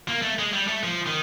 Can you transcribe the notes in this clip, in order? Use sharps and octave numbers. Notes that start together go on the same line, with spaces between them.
A#3
A3
G#3
G3
A3
F3
D#3